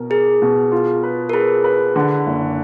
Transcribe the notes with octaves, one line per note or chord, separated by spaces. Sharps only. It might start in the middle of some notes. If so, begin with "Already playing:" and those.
Already playing: B2 A#4
G#4 A#4
B2
F4
B4
A#4
G#4 B4
B4
D3
F#1